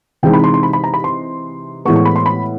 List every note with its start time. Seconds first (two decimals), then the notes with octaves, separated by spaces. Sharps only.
0.23 C3 E3 G#3 C4 D#4 G5
0.33 B5
0.44 C6
0.54 C6
0.63 B5
0.73 B5
0.84 A#5
0.94 B5
1.04 C6
1.85 A2 E3 G#3 B3 C#6
1.96 C#6
2.05 B5
2.16 C6
2.26 B5